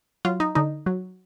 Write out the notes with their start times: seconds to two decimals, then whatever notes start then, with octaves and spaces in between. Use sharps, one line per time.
0.25 F#3 F4
0.40 D#4
0.55 D3 D#4
0.86 F#3